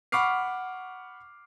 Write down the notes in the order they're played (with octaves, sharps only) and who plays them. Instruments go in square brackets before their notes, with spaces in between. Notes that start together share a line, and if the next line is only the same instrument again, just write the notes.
[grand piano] F#5 B5 C#6 D6 F6 C7